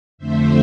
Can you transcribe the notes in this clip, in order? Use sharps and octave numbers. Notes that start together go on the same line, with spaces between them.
F2 D3 A3 C5 E5